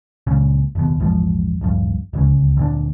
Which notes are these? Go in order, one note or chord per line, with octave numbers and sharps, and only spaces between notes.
C#2 A#2 C#3
F#1 D#2 B2
A#1 E2 G#2 F3
D1 A#1 G2
D1 C#2 C#3
D2 A#2 D4